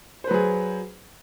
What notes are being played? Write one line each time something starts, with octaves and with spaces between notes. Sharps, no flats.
F#3 G#4 B4 C5